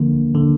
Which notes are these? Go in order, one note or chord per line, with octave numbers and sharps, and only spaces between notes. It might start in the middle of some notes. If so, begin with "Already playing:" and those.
Already playing: D3 F3 A#3
D3